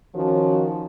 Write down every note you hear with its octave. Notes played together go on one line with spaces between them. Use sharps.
D#3 F3 C#4 F#4